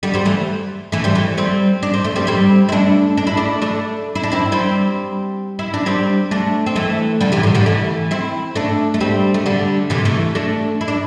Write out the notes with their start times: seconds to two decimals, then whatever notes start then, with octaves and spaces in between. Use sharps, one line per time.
0.03 D3 G3
0.14 G3 C4
0.25 E3 A3
0.92 E3 A3
1.04 G3 C4
1.15 E3 A3
1.38 G3 C4
1.83 D4
1.93 C4
2.04 A3
2.16 G3 C4
2.27 G3 C4
2.69 E4
2.72 A3 D4
3.17 D4
3.27 E4
3.37 A3 D4
3.62 A3 D4
4.15 E4
4.23 D4
4.32 C4 E4
4.52 G3 C4
5.59 E4
5.74 D4
5.86 G3 C4
6.31 A3 D4
6.66 C4
6.76 E3 A3
7.21 D3 G3
7.32 C3 E3
7.43 A2 D3
7.55 D3 G3
7.66 E3 A3
8.11 C4 E4
8.55 A3 D4
8.94 A3
9.00 G3 C4
9.34 A3
9.46 D3 G3
9.90 C3 E3
10.05 E3 A3
10.35 A3 D4
10.81 E4
10.88 D4